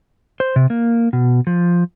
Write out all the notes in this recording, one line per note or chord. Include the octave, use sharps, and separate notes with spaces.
C5
C3
A#3
B2
F3